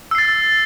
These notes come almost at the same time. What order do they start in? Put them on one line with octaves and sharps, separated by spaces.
E6 C7 A6